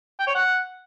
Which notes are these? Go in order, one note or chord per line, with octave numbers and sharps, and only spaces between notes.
G5
C#5
F#5